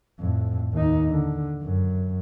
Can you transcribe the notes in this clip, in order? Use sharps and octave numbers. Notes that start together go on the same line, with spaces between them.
F2 A2
D#2 D#4
D3
F#2